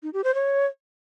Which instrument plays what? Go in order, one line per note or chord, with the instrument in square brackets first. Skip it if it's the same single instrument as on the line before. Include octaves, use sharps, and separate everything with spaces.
[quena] D#4
G4
C5
C#5